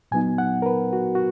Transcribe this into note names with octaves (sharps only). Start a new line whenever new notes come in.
A#2 F#3 B3 D#4 G#5
F#5
A#4
B4
F#4
F#4